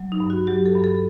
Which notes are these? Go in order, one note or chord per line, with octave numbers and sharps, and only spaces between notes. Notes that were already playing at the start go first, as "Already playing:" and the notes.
Already playing: F#3
D#4
G2
F#4
F#3 G4
A4
G2
A4